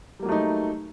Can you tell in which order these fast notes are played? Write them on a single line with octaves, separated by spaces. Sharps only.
G3 A#3 F#3 A3 D#4